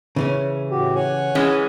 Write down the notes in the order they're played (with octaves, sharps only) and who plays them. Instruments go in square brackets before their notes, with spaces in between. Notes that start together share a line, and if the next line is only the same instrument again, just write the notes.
[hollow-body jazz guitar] C#3 E3 C#4
[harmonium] A2 F#4 G4
C#5 F#5 G#5
[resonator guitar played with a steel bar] E3 G#3 C#4